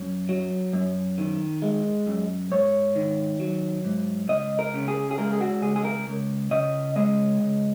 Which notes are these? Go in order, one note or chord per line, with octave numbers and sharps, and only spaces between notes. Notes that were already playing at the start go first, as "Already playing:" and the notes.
Already playing: F#2
F#3
F#2
D#3
G#3
F#2
G#2 C#5
D#3
F#3
G#2
C#2 D#5
A#4
C#3
G#4
G#4
G#3 A#4
G#4
F#4
C#2 G#4
G#4
A#4
C#2
C#3 D#5
G#3 D#5
C#2